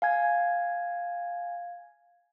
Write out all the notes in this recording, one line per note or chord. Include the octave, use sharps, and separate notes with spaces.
F5 G#5 G#6